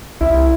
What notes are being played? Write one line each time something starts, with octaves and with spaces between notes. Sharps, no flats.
C2 E4